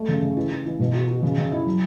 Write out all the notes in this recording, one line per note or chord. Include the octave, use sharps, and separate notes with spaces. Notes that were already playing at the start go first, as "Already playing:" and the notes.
Already playing: A3
C#3
C#3
E3
E3
E3
B2
F#4
F#4
C#3
C#3
E4
F#3